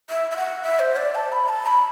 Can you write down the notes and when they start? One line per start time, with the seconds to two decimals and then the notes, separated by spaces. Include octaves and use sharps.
0.10 E5
0.31 E5
0.37 F#5
0.63 E5
0.79 C5
0.96 D5
1.15 A5
1.32 B5
1.49 A5
1.66 B5